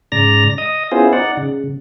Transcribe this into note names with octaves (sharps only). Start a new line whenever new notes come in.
G#2 C#3 D5 A#5 A#6
D#5 D#6
B3 C#4 E4 F4 G#4 C5
D#4 D5 F#5
C#3